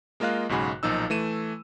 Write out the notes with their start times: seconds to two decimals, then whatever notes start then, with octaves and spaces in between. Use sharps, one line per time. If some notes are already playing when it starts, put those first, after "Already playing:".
0.20 G#3 A#3 F4 D#5 F5 F#6
0.49 B1 G#2 C#3 F#4 G#5 B5
0.83 B1 A#2 F3 D#4 E6
1.10 E3 A3 D#7 E7